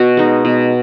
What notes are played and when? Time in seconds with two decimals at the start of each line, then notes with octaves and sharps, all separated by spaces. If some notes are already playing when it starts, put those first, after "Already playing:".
Already playing: B2 F#4
0.17 G#3 D#4
0.45 B2